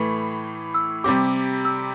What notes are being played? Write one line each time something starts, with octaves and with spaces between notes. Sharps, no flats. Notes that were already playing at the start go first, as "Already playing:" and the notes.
Already playing: A2 E3 A3 B5
E6
C3 G3 C4 G4 D6
E6